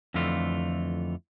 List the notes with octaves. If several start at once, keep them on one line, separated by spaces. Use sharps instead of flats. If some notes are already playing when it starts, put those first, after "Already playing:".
F2 D3 E3 A3 F4